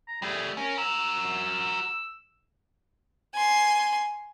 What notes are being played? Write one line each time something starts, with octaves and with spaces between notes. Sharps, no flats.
A#5
G3 A3 G#4
C#4 A#4
F#4 A#4 E6
G#5 C6